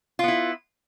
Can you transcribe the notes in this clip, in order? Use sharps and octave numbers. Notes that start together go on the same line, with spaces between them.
B3 E4 F4